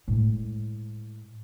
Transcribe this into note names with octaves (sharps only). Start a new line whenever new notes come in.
A2 G#3